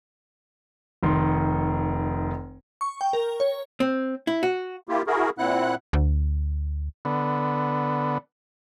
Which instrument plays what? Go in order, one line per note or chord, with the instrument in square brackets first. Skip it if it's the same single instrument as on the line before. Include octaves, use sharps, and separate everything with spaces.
[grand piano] F1 D#3 C6
[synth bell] C#6
G5
A#4
C#5
[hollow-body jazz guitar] C4
E4
F#4
[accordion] A#3 E4 F4 G4
E4 F#4 G#4 A#4
A#2 C4 E4 F#5 F#6
[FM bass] D2
[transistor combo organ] D3 B3